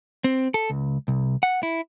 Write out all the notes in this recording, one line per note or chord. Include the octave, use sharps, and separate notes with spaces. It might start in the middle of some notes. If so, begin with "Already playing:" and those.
C4
A4
C#2
C2
F#5
E4